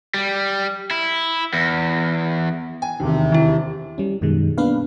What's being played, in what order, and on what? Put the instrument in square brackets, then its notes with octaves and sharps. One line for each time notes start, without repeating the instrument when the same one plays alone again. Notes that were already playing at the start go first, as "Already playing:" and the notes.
[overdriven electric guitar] G3
E4
E2
[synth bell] G5 [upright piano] G#5
[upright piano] E1 D#2 [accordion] C3
[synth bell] D#3 E4
[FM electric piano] G3 C#4
F#2 B2 D#3 G#3
A#3 B3 D4 B4 F5